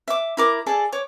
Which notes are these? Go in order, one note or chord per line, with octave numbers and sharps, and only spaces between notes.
E5 D6
E4 A#4 D6
G#4 A4 D5 A5
C#5 D6